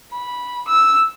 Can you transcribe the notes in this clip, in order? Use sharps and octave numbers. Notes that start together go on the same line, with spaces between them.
B5
E6